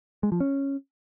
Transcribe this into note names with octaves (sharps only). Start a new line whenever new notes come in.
G#3
F3
C#4